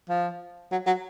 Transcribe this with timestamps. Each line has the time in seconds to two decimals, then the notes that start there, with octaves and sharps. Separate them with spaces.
0.09 F3
0.72 F#3
0.87 F#3